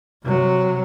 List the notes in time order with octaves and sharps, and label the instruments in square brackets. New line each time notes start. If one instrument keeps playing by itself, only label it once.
[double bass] C3 F#3